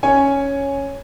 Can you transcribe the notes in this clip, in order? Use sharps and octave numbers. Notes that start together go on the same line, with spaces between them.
C#4 C#5 G#5